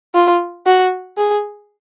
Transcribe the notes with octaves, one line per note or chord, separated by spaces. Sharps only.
F4
F#4
G#4